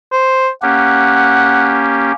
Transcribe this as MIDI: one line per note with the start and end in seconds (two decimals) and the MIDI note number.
0.12 0.49 72
0.62 2.12 58
0.62 2.12 61
0.62 2.12 67
0.62 1.81 78